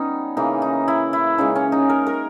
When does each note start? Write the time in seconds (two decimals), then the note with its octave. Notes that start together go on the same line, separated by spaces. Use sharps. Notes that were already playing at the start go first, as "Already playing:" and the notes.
Already playing: G3 B3 C#4 D#4
0.37 C#3 E3 A#3 D#4
0.62 D#4
0.88 E4
1.13 E4
1.38 C#3 E3 G#3 D#4
1.55 C#4
1.72 D#4
1.89 A#4
2.07 A#4